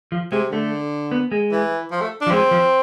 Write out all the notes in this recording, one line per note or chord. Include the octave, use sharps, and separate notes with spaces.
F3
C3 G#3
D3 A3
B3
G#3
E3
F3
A3
D4
F3
G#3 C4
F3